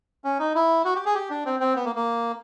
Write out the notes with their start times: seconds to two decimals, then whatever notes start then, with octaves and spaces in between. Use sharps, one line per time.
0.24 C#4
0.39 D#4
0.55 E4
0.85 F#4
0.95 G4
1.05 G#4
1.15 G4
1.30 D4
1.45 C4
1.60 C4
1.76 B3
1.85 A#3
1.96 A#3